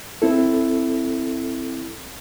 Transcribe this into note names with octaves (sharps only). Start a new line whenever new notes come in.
C4 E4 A4